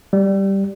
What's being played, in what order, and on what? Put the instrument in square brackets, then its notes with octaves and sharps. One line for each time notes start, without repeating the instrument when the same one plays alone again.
[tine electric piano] G3